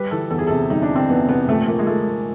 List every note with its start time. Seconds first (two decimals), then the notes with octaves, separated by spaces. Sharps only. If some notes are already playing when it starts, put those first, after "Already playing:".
Already playing: G3 B4
0.11 E3 A4
0.30 E2 A4
0.38 G#4
0.47 C3 A4
0.70 G3 D#4
0.82 D4
0.89 E3
0.95 C4
1.09 E2 B3
1.29 C3 B3
1.48 A#1 A3
1.68 F3 A#3
1.79 G#3
1.87 A3